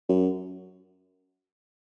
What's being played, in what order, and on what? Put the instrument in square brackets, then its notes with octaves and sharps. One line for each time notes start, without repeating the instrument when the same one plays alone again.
[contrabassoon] F#2